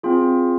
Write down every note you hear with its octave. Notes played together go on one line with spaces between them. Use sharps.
C4 F4 G#4